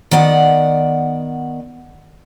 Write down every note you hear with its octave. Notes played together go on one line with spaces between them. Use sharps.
D#3 B3 D5 F#5